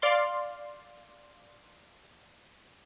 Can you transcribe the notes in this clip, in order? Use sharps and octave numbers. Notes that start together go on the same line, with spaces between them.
D5 F5 C6